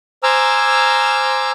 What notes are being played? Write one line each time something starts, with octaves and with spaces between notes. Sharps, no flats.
C5 G#5 A#5 D6 E6 F6